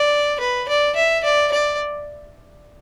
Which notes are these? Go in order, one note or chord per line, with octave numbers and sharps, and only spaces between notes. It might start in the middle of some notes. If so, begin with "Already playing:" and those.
Already playing: D5
B4
D5
E5
D5
D5